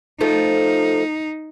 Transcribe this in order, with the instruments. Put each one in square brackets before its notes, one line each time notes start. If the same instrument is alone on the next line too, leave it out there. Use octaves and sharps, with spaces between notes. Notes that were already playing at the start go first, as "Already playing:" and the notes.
[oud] F3 A3 [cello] D#4